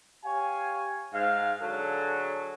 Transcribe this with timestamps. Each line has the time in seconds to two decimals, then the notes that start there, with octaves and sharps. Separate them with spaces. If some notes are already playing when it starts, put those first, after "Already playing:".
0.25 G4 C#5 F5 G#5
1.14 G#2 F5
1.62 D3 F#3 G#4 A4